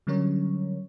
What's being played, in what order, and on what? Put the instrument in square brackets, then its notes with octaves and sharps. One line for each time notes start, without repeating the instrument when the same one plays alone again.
[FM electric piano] D3 F#3 G3 C#4 A#4 C#5